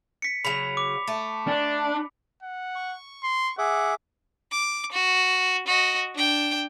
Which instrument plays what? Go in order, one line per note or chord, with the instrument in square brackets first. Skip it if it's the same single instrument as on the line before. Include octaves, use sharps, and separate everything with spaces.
[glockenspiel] B6 C#7
[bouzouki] C#3 F#3 [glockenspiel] B5 B6 F7
[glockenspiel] D6
[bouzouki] A3
[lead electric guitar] D4
[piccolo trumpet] F#5
[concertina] C#6
[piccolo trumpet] C6
[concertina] G#4 E5 D6 [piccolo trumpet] F#5
[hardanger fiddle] D6
F#4
F#4 D#5
D4 G5